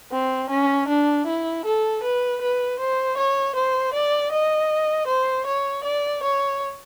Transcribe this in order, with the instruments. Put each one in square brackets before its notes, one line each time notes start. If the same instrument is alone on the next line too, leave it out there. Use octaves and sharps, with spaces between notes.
[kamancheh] C4
C#4
D4
E4
A4
B4
B4
C5
C#5
C5
D5
D#5
C5
C#5
D5
C#5